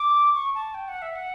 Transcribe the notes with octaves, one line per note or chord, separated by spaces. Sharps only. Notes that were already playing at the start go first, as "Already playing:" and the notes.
Already playing: D6
C#6
A5
G5
F#5
E5
F#5